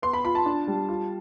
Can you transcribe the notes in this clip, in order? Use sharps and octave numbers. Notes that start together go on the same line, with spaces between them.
B3 C6
B5
F4 B5
A5
D4
G3
F4